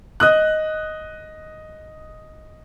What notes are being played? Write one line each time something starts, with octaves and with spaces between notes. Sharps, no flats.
D#5 D#6 F#6